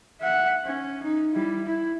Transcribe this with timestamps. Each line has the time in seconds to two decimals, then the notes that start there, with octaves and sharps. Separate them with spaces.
0.21 E5 F#5
0.64 C#4
1.03 D#4
1.33 G3 E4
1.66 E4